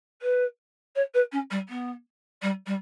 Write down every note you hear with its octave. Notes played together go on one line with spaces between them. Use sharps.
B4
C#5
B4
C#4
G3
B3
G3
G3